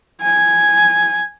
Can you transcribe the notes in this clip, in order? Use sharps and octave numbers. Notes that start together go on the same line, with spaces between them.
G#5